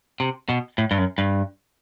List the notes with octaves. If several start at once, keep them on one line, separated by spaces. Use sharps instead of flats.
C3
B2
A2
G2
F#2
G2